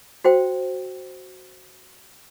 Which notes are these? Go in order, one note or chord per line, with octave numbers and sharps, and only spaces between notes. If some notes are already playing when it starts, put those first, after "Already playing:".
F#4 C5 G5